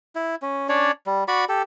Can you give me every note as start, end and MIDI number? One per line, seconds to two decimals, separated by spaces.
0.15 0.35 64
0.42 0.69 61
0.69 0.91 61
0.69 0.91 62
0.69 0.91 73
0.69 0.91 74
1.06 1.24 55
1.28 1.45 66
1.28 1.45 74
1.28 1.45 83
1.28 1.45 85
1.49 1.62 67
1.49 1.62 69